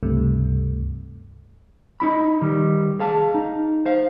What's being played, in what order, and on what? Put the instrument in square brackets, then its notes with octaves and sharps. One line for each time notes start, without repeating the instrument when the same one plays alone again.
[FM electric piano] C#2 G2 C3 A3
[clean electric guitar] D#4 E4 B5
D#3 G3
G#4 F5 A5
D#4
C5 F5